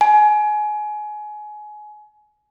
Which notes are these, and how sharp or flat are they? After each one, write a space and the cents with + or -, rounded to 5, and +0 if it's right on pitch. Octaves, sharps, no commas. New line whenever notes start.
G#5 +25